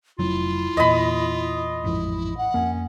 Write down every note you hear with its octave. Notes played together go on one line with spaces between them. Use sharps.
F1 F#3 E4 F4
E2 A#2 D#5 B5
A1 F2 G#2 E4
F#5
F2 A#3 C#4